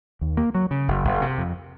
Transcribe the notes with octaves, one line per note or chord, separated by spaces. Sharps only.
D#2
A#3
F#3
C#3
F#1
F#1
C3
F2